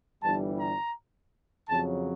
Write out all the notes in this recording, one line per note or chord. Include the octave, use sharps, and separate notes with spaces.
G1 G2 E3 G3 A5
A#5
F2 C#3 F#3 A5